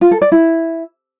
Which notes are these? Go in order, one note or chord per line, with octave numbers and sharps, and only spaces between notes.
F4
A4
D5
E4